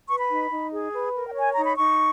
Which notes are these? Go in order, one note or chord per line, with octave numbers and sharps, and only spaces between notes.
B4 C#6
B5
D#4
D#4
G#4
B4
A#4
G5
C#5
G#5
D#4 A#5
B5
D#4 C#6